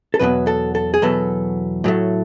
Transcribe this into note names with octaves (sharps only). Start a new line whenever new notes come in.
A4
E2 B2 F#3 B3 B4
A4
A4
G#4
E2 B2 F#3 B3 A4
A2 F#3 A3